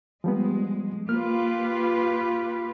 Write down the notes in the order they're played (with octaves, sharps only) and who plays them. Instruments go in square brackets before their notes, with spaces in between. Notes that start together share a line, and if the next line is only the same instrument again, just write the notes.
[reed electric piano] F3 G3 B3 [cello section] G#3
[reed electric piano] A#3 F6 [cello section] F4 G4 B4